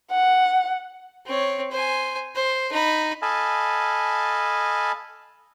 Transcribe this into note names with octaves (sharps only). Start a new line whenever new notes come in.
F#5
C4 C#5
C5 G#5
C5
D#4 B5
A4 D#5 F5 G#5 A5 B5